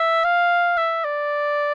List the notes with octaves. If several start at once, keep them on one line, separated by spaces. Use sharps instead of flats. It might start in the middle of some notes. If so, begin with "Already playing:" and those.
Already playing: E5
F5
E5
D5